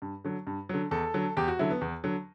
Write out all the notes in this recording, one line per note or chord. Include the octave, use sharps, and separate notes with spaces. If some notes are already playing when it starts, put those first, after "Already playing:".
G2
D3 F#3
G2
D3 F#3
E2 A4
D3 F#3
E2 G4
F#4
D3 F#3 E4
B3
E2
D3 F#3